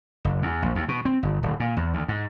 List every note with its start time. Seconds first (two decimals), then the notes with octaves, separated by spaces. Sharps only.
0.25 F#1
0.42 E2
0.62 A#1
0.75 D#2
0.88 B2
1.05 C4
1.23 G1
1.43 D1
1.60 A#2
1.77 E2
1.94 D2
2.08 G#2